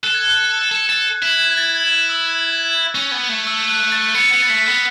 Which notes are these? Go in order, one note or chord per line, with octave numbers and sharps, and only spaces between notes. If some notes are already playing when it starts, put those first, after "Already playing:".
A4 F#6
G#6
F#6
A4
A4
E4
G#6
A6
G#6
F#6
E6
C#4
B3
A3
E6
F#6
A6
B3 C#7
B3
A6
A3 B6
B3